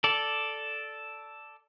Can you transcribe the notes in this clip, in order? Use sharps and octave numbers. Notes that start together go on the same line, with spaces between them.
A4 D5